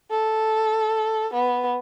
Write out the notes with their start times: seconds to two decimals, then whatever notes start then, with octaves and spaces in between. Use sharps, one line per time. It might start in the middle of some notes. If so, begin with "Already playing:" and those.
0.11 A4
1.33 B3